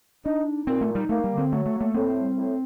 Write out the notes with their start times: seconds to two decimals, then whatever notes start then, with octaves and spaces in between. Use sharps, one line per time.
0.25 D4 D#4
0.46 D#4
0.67 A#2 C4
0.81 A3
0.89 D#4
0.95 G3
1.09 A3 A#3
1.24 G3
1.31 D3
1.38 C4
1.52 F#3 A3
1.66 A3
1.73 A#3
1.81 A3
1.94 A2 C4
2.15 G3
2.37 A2